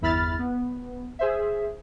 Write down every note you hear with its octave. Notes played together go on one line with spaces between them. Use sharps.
G1 E2 E4 B5 F6 A6
B3
G#4 C5 E5